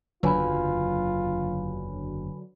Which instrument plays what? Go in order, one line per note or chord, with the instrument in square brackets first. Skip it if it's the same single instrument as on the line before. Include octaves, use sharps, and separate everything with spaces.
[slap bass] F#1 E2 [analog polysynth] D3 F#3 [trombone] F4 [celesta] B4 G#5 B5